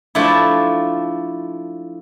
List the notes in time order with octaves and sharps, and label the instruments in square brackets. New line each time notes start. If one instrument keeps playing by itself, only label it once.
[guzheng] F3 A3 D4 E4